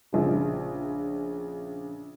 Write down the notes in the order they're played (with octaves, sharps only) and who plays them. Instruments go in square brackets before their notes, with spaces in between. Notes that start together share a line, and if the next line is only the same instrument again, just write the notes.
[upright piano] A#1 C#3